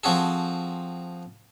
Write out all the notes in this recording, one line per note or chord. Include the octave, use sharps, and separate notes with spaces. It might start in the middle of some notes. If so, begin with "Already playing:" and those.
F3 C4 F#4 G#4 A4